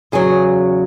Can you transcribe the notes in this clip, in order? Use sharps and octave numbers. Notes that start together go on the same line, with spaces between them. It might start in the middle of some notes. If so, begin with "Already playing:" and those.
E2 C#3 F#3 G#4